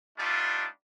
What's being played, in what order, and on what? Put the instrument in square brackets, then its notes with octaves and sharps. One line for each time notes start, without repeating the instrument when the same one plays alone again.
[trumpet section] G3 A3 B3 D4 D#4 F4